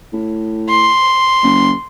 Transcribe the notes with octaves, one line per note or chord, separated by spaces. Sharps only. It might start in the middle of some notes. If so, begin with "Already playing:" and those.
A2
C6
F#1